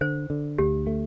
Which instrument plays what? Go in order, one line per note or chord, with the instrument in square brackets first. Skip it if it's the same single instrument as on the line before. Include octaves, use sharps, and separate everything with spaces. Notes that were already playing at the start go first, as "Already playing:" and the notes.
[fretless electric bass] D3 [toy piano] C5
[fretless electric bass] D3
[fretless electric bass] D2 [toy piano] G4
[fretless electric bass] A3